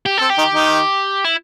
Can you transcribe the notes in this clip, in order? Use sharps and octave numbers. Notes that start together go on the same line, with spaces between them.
G4
C4 A4
G4
D#3 D#4
D#3 D#4
E4